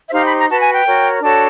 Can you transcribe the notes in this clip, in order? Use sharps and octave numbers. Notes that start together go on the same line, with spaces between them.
E5
D#4 G4 C5 F5
B5
A#5
F#4 B4 A5
G#5
G5
F#4 A#4 C#5
D4 F#4 A4 C#5 A5